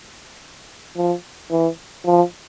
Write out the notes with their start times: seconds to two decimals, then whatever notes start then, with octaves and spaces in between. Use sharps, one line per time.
0.96 F3
1.51 E3
2.05 F3